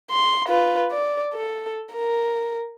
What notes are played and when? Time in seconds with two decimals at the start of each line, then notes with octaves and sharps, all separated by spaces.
0.11 C6
0.49 F4 B4
0.92 D5
1.34 A4
1.94 A#4